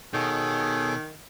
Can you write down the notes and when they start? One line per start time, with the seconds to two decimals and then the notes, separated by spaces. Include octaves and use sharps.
0.14 B2 D#3 G#4 A4 C#5